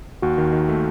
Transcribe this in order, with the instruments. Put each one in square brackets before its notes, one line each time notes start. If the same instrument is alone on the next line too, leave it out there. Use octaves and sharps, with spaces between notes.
[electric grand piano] D#2 [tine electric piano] F#4
[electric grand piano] D#3
D#3
A3